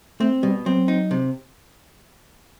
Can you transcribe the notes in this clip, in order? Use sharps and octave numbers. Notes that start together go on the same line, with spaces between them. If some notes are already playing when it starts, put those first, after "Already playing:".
A3 C4
B2 G3
F#3 C4
D#4
C3